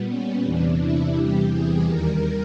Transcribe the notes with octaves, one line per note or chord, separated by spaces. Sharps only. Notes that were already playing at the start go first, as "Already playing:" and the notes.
Already playing: A#2 G3 B3
C#4
E2 C3 E3 D4
E4
E2 C3 E3 G3 G4
G#4
D#2 D#3 G3 A#4